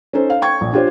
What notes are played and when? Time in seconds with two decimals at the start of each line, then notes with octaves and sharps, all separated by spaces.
0.13 C#4 D#4 A4 C5
0.30 F5
0.42 G5 C#6 G#6
0.61 A#1
0.73 D4 F4 G4 C5 C#5